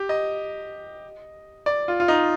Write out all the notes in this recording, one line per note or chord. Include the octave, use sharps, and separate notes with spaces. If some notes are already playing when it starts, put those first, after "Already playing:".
Already playing: G4
D#5
D5
F4
F4
D#4